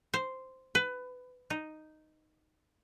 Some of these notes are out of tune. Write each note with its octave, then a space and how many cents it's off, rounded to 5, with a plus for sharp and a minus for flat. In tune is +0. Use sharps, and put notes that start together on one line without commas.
C5 -5
B4 +20
D#4 -5